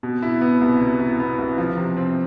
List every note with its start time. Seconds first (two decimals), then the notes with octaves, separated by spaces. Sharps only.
0.03 B2
0.22 E4
0.42 B3
0.61 C2
0.81 B2
1.00 E4
1.20 B3
1.38 C2
1.58 F3
1.77 C3
1.97 C4